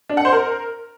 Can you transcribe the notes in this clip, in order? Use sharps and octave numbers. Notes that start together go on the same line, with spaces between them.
D4
F#5
C5
A#4